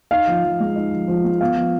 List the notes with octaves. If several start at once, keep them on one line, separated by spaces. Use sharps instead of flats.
D#4 F5
F3
F3
G#3
D#4
F3
F3
G#3
B3 F5
F3